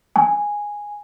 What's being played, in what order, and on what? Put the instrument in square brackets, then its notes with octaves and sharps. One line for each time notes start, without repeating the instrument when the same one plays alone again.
[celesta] G#5